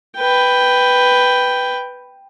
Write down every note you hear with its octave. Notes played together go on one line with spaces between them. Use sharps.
B4 G5